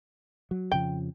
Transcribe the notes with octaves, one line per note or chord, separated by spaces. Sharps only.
F#3
F2 C#3 F3 G5